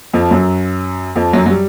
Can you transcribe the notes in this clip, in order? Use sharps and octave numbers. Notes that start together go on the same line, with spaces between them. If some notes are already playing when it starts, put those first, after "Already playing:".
F2 F3
F#2 F#3
F2 F3
F#2 F#3
F#3
G3